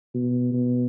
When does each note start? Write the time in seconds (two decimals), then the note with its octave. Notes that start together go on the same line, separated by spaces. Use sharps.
0.14 B2
0.53 B2